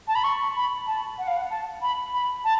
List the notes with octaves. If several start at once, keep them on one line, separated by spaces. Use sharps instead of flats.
A5
B5
C#6
B5
A5
F#5
F5
F#5
A5
B5
B5
A5